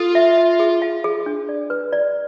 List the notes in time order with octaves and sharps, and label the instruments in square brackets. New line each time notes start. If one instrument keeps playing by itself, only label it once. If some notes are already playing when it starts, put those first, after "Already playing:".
Already playing: [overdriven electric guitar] F4 [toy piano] A4
[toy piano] E5
E5
G#4
F5
G#4
D4
D5
B4
D5